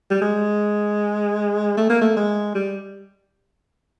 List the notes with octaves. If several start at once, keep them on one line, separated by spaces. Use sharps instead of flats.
G3
G#3
A3
A#3
A3
G#3
G3